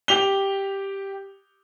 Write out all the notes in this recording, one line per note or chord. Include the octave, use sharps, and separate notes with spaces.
G4 F7 G7